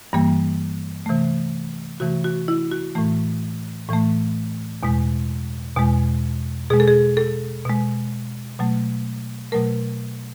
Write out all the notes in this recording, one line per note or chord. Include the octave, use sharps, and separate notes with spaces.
G2 E3 G3 A#3
C3 E3 A3
C3 E3 A3 F#4
F#4
E4
F#4
A2 E3 A3
A2 E3 A3
E2 B2 G#3
E2 B2 G#3
B2 G#3 G#4
A4
G#4
A4
B2 G#3
B2 F#3 A3
B2 F#3 A3 A#4